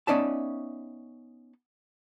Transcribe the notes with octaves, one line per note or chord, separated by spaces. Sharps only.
B3 C#4 D#4 D5 E5 A5